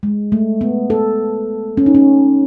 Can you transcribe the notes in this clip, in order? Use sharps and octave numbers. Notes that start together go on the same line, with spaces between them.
G#3
A3
B3
A4
C#4
D#4
C#4